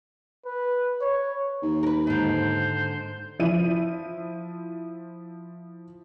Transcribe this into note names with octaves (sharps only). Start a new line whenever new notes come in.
B4
C#5
D#2
A#4 B4
G#2 D3 C5
F3 E4 D#7